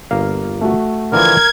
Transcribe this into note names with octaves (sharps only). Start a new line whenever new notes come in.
G1 A#3 F5
A3 F#4
D3 E3 F3 A#4 G#6